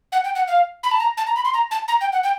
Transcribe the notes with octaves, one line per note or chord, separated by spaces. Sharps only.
F#5
G5
F#5
F5
B5
A5
A#5
A5
A#5
B5
C6
A#5
A5
A#5
G5
F#5
G5